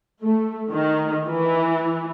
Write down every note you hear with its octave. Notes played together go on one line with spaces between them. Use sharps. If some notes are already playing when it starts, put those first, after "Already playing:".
A3
D#3
E3